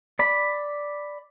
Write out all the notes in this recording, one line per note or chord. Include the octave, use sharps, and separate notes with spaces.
D5 B5